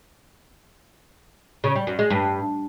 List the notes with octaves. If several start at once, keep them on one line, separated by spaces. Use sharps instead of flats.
C#3
G3
F#2
G#3
G2